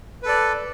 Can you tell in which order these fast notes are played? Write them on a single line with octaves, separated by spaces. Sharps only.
B4 A4 D5